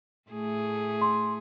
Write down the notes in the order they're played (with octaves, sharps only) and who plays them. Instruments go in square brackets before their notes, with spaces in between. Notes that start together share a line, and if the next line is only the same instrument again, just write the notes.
[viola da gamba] A2 A3 G#4
[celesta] C6